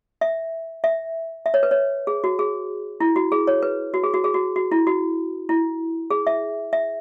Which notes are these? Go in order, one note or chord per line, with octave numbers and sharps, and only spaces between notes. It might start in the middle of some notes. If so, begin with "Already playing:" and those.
E5
E5
E5
C#5
B4
C#5
G#4
F#4
G#4
E4
F#4
G#4
C#5
B4
F#4
G#4
F#4
G#4
F#4
F#4
E4
F#4
E4
G#4
E5
E5